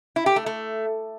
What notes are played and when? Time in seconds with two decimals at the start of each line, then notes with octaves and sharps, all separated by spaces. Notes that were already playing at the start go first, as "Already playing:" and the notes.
0.16 E4
0.26 G4
0.36 A3
0.46 A3